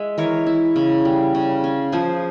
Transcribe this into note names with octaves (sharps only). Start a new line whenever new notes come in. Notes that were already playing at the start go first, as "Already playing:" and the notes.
Already playing: G#3 E5
E3 A#4 C#5
E4
C#3
G3
C#3
C#4
F3 G#4 C5